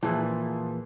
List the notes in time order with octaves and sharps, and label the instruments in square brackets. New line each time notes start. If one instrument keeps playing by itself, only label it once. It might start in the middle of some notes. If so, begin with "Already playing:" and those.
[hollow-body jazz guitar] A#2 E3 [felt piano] F3 G#4